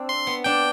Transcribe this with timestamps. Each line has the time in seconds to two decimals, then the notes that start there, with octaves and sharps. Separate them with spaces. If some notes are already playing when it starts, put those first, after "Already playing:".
Already playing: C4 D4
0.09 C6
0.27 B3
0.44 D4 G5